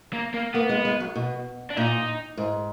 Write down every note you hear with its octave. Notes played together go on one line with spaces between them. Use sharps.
A#3
A#3
A#3 B3
G#3
G#3
F#3
B2
D4
A#2 D#4
G#2